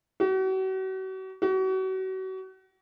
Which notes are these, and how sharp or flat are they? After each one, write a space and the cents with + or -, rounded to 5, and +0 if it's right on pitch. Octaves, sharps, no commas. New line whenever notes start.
F#4 +40
F#4 +35